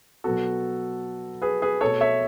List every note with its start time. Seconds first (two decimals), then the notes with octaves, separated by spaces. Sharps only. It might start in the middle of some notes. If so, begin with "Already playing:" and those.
0.24 B2 F#3 B3 F#4 A4
1.42 G#4 B4
1.62 G#4 B4
1.81 B2 A3 A4 C#5
2.01 C#5 E5